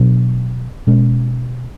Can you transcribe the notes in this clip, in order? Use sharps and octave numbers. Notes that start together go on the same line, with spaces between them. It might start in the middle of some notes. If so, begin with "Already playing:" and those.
Already playing: B2 F#3 B3 D4
B2 G#3 C#4